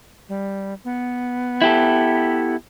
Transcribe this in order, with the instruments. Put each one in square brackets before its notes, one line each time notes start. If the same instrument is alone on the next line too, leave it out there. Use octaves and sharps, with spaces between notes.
[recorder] G3
B3
[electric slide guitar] E4 G4 A4